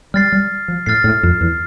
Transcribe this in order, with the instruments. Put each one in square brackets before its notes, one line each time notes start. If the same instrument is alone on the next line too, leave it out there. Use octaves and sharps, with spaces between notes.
[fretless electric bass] G3 [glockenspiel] F6 A6 C7
[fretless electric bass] G3
F3
[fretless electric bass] A2 [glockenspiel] F6 A6 C7
[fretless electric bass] A2
F2
E2